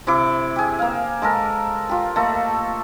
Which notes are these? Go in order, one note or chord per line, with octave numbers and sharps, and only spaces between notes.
C3 E4 D6
G4 G#4
A#3 F5
G#3 A4 A#4
F4 G4
A3 A#3 A4 D#5